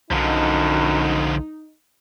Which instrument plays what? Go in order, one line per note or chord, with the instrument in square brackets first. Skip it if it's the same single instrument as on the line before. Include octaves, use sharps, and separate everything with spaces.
[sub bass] B1 [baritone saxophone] F#2 [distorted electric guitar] D3 F3 [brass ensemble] D#4